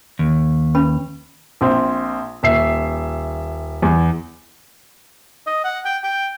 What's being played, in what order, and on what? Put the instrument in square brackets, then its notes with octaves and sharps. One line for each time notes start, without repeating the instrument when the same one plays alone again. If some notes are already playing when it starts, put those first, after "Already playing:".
[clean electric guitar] D#2
[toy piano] C#4 B4 B5
[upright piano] A#1 C4
D#1 E5 C7
E2
[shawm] D#5
F#5
G5
G5